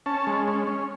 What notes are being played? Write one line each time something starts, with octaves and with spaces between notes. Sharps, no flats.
C#4 A5
G#3
C#4
C#4